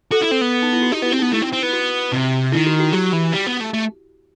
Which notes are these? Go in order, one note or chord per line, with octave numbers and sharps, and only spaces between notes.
F#4 A4
E4
C4
B3
D#4
E4
F#4
D#4 G4
B3 E4
C4
B3 D#4
A3 E4
C4
C4
B3
F#4
C3
D#3 E4
F#4
F#4
F#3 G4
E3
G3
B3
A3
A3